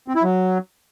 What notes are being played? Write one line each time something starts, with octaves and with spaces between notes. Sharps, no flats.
C4
E4
F#3